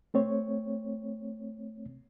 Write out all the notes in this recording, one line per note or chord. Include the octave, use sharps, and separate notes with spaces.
A3 C4 C#5